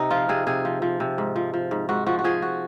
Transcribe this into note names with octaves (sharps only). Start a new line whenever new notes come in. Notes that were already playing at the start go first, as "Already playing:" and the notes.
Already playing: C3 D#4
F3 F4
C3 G#4
C3 G#4
F3
F3
C3
G#2
F3
F3
G#2
G#2 F#4
F3 F#4
F#4
F3 G#4
F#4